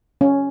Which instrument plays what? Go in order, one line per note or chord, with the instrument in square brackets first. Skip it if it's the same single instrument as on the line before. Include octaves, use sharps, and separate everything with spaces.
[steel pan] C#4